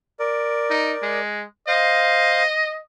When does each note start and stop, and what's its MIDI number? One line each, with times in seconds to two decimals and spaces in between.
0.19 1.20 70
0.19 1.20 74
0.70 0.92 63
1.02 1.45 56
1.68 2.43 72
1.68 2.80 75
1.68 2.43 77